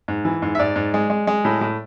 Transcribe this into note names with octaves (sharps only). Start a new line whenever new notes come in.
G#2
E3
G#2
E5
G#2 D5
G#2
G#3
G#3
G#3
A2
A2